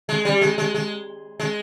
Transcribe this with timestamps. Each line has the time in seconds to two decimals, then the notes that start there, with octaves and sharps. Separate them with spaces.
0.09 G#3
0.25 G3
0.41 G#3
0.58 G#3
0.74 G#3
1.40 G#3